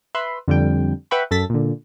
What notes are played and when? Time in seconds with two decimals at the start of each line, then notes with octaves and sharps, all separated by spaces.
0.15 B4 E5 B5 C6
0.48 F2 D3 G3 G5
1.11 B4 E5 F#5 G5 B5 C#6
1.31 F#2 A4 A6 B6
1.50 A#2 D3